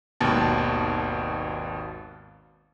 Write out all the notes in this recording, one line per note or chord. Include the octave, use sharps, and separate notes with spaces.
G#1 D#2 B2 A5